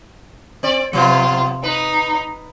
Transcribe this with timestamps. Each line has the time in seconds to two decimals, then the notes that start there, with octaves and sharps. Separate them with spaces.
0.63 C4 D5
0.93 C3 F3 B3 F4
1.64 D#4 B4